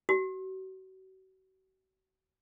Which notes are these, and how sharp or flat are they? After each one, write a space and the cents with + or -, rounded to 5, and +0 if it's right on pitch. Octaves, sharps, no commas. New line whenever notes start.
F#4 +40